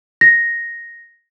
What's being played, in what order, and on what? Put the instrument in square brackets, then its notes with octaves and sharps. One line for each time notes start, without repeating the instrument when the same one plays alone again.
[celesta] A#6